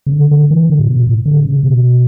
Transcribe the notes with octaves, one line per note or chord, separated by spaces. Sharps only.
C#3
D3
D3
E3
D3
A2
B2
A2
D3
C#3
B2